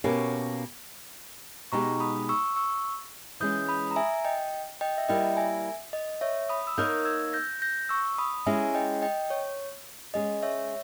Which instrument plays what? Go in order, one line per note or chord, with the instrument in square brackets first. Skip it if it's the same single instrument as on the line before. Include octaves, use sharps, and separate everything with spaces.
[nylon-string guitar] B2 A#3 C#4 G4 C#5
[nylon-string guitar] B2 G#3 D#4 G4 [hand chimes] A#5 C#6
[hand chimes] B5 D#6
C#6 E6
C#6 E6
[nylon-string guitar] E3 G#3 C#4 [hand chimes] D#6 G6
[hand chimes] B5 D#6
A#5
E5 G#5
D#5 G5
D#5 G5
E5
[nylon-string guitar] G3 A#3 E4 A#4 [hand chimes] D#5 G5
[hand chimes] E5 G#5
D#5
C#5 E5
B5 D#6
E6
[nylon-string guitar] A#3 D#4 A#4 C#5 [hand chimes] D#6 G6
[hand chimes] E6 G#6
G6 A#6
G6 A#6
C#6 E6
B5 D#6
[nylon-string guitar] G#3 C#4 E4 G4 [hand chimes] E5 G#5
[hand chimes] D#5 G5
D#5 G5
C#5
[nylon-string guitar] G#3 C#4 G#4 [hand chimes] D#5
[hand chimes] C#5 E5